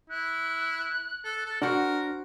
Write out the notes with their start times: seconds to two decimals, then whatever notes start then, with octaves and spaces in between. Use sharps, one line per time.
0.10 E4 F#6
1.25 A4
1.46 A4
1.62 D4 F#4 A#4 C5 F#5